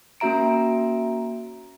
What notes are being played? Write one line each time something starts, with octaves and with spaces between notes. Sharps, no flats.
A#3 C#4 F#4 E5 A#5 D7